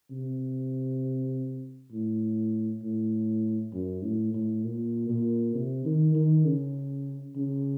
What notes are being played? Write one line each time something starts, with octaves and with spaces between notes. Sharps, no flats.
C3
A2
A2
F#2
A2
A2
A#2
A#2
C3
D#3
D#3
C#3
C#3